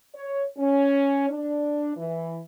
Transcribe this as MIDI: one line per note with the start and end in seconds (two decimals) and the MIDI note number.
0.14 0.44 73
0.57 1.29 61
1.30 1.92 62
1.97 2.40 52